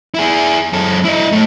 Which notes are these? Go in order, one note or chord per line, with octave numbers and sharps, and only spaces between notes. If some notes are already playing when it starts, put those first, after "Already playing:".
E4 G#4
F#2 A4
E4 D#5
A2 A3